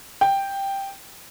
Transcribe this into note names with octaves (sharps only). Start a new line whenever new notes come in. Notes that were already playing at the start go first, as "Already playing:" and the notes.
G5